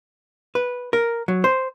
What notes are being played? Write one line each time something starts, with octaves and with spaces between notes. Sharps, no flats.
B4
A#4
F#3
C5